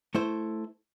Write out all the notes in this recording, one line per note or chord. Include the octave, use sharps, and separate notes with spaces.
A3 E4 C5